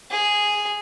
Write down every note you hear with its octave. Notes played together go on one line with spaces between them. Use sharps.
G#4